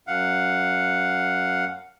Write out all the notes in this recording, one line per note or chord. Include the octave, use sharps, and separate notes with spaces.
F#2 F5 F#5